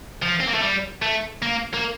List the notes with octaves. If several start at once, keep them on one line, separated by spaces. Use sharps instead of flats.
F3
C4
A#3
A3
G3
A3
A#3
A#3